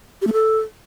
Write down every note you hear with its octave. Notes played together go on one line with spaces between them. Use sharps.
G4
A3
A4